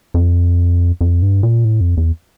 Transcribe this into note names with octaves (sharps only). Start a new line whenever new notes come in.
F2
F2
G2
A#2
A2
F2
E2